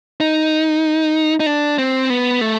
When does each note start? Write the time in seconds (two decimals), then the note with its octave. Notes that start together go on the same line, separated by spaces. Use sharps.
0.20 D#4
1.40 D#4
1.46 D4
1.78 C4
2.10 B3
2.41 A3